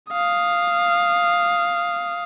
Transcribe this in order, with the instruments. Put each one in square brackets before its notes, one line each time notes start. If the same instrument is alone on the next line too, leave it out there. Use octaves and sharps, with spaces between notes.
[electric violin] F5 D#6